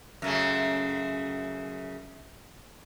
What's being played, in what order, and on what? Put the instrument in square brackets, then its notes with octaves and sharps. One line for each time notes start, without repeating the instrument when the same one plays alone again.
[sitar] F#2 C#3 A3